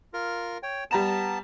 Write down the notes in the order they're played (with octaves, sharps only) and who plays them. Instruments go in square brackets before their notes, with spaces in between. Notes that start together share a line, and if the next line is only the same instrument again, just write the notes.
[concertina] F4 A#4
C#5 G5
[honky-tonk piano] G3 A#5 E7 [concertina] B3 A5